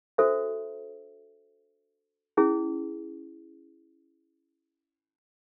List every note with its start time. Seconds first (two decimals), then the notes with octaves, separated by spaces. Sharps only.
0.18 D4 F#4 A4 C5 E5
2.37 C#4 E4 G#4